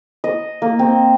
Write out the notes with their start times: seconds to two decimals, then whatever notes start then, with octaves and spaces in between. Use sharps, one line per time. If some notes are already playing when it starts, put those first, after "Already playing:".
0.24 D#5
0.62 A#3
0.79 C4